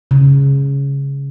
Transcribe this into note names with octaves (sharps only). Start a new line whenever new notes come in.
C#3